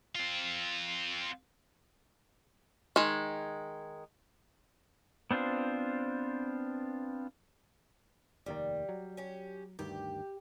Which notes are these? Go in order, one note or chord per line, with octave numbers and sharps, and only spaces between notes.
C4 F4
D#3 G#3
B3 C4 D4 F4 C5
F1 D#2 D#3 G3
F#3
C#4 G4
D2 G2 D#3 G4